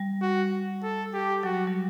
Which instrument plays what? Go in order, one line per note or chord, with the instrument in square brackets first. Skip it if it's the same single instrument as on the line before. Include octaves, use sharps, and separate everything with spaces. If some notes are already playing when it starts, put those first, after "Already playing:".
Already playing: [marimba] G3
[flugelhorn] F#4
A4
G4
[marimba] F#3 [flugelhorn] F#4
[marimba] G3